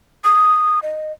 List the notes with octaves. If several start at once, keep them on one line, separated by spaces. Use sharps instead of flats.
D#6
D#5